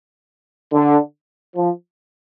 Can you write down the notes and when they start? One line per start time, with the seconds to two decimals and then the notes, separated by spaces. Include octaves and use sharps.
0.73 D3
1.56 F3